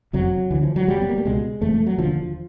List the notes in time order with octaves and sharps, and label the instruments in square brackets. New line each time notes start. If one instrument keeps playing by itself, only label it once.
[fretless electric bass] F#1 F2 C3 F#3
D2 D3 E3
F3
F#3
F1 F2 C3 G3
B3
A#3
A3
C#2 B2 G#3
F#1 E2 C3 A3
A3
F#3
E1 D#2 D3 F3